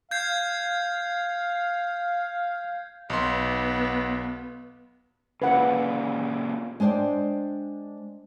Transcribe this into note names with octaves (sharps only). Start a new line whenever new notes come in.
F5 G6 G#6 C7
B1 B3 C6
A#2 C#3 B4 F#5
G#3 D4 C5 D5 G5